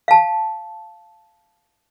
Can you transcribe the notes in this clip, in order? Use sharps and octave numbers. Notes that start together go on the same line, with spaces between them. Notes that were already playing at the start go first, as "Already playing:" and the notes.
F5 A5